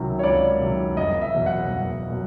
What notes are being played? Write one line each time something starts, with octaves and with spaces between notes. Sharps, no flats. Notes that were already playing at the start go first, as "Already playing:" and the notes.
Already playing: C#2 C3 D#3 F#3
C#5
C#2 D5
C3 D#3 F#3
F#1 D#5
E5
E2 B2 F#3
F#5
F#1
B2 F#3